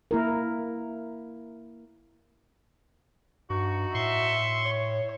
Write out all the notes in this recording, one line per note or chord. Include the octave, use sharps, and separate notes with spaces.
A#3 E4 A#4
G2 D#4 F#4
A2 E5 C6 C#6
C#5